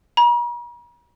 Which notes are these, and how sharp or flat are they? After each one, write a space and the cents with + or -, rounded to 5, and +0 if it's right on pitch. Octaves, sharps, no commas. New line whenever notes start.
A#5 +45